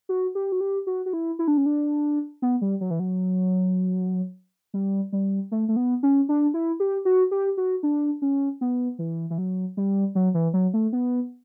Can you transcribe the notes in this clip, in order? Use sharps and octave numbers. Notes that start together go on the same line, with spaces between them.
F#4
G4
F#4
G4
F#4
F#4
E4
E4
D4
C#4
D4
B3
G3
F#3
E3
F#3
G3
G3
A3
A3
B3
C#4
D4
E4
G4
F#4
G4
F#4
D4
C#4
B3
E3
E3
F#3
G3
F#3
E3
F#3
A3
B3